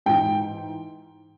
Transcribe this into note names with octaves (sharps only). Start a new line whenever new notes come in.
G#2 E3 G5